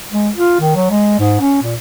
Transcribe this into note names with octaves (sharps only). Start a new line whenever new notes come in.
G#3
F4
D#3
F#3
G#3
G#2
C#4
A#2